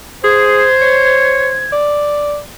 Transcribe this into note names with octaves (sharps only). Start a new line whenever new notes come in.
G#4 C5 G#6
C#5
D5